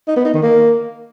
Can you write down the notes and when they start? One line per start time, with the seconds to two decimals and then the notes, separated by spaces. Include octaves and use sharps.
0.07 D#4
0.16 B3
0.25 D#4
0.34 D#3
0.42 A#3